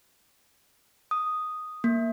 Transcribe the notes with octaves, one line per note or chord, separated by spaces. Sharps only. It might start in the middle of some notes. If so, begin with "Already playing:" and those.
D#6
A#3